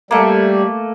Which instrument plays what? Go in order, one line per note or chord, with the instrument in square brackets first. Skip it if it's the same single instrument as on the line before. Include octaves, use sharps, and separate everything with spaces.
[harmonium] G3 [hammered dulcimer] A3 A#3